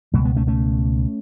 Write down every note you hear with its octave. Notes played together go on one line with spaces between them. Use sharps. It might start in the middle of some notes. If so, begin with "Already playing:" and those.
C#2 B2 F#3 A3
G#3 B3
A3 C#4
A3 C#4